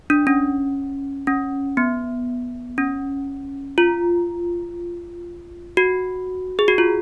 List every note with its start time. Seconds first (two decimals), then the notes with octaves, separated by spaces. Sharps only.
0.10 D4
0.27 C#4
1.27 C#4
1.77 B3
2.78 C#4
3.78 F4
5.77 F#4
6.59 G#4
6.68 F#4
6.78 F4